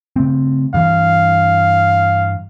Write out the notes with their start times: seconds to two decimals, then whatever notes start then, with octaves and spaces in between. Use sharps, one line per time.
0.16 C#3 A3 C4
0.74 G2 E3 F5